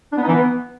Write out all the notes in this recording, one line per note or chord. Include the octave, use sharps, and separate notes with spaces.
D4
B3
D#4
E3
B3